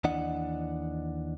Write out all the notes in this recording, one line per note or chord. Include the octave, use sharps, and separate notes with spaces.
D#2 E3 D4 D#5 F#5